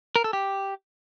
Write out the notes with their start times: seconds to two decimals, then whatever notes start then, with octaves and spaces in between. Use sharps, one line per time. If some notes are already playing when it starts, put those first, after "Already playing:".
0.16 A#4
0.24 A4
0.33 G4